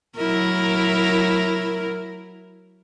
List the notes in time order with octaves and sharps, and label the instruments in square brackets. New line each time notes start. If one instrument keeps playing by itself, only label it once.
[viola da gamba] F#3 E4 A#4